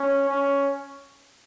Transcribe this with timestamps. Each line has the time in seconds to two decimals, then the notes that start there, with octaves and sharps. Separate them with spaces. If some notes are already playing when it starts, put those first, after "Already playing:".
Already playing: C#4
0.29 C#4